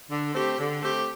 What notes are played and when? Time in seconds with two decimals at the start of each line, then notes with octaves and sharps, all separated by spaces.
0.10 D3
0.34 A3 C4 G4
0.58 D3
0.82 A3 C4 G4